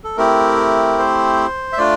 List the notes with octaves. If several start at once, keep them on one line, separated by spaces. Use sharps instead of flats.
A4
A3 C4 E4 G4 A#4
C5
E5
A3 D4 F4 D5